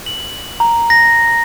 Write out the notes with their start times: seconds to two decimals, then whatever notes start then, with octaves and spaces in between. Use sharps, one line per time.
0.06 F#7
0.60 A#5
0.90 A#6